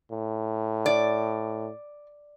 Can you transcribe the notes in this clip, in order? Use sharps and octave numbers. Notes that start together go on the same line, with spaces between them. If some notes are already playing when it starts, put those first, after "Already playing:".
A2
D5